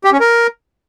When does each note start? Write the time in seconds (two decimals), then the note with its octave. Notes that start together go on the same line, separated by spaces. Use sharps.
0.04 G4
0.12 C#4
0.20 A#4